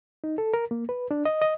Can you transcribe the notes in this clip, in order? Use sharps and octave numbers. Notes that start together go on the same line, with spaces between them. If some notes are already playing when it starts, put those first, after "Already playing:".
D#4
A4
A#4
A#3
B4
D4
D#5
D#5